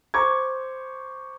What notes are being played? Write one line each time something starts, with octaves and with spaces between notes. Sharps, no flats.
C5 A#5 C#6 D6 G#6